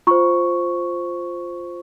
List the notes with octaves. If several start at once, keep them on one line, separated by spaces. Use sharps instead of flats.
F4 C5 C#6